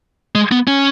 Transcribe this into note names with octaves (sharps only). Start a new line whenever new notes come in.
G#3
B3
C#4